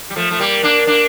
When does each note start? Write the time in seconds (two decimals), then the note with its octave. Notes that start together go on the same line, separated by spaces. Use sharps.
0.10 G3
0.16 F3 A3
0.31 A3
0.40 G3 A#3
0.63 A#3 D4
0.87 A#3 D4